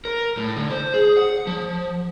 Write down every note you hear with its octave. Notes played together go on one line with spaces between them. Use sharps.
A#4
A2
D3
C5
G#4
F#5
F3